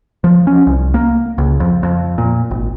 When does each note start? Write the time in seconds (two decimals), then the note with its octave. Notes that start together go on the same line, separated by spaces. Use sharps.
0.24 F3
0.47 C#4
0.67 C2
0.94 A#3
1.38 C#2
1.60 F2
1.83 F2
2.18 A#2
2.51 G#1